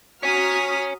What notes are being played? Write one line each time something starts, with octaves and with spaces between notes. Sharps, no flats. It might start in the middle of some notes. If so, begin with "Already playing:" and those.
F#4 C#5 G#5 A#5 D#6 F6 B6